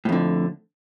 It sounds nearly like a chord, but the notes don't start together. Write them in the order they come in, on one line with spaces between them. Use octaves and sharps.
A2 F2 D3